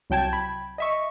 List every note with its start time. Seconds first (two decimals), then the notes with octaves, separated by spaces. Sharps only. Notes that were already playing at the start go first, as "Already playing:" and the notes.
0.10 C2 F#3 G5 A5 G#6
0.33 B5
0.78 D#5 E5 C#6